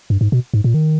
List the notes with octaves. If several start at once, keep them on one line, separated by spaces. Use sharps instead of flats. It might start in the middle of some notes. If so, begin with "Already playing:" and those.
G2
G#2
B2
G#2
A#2
D#3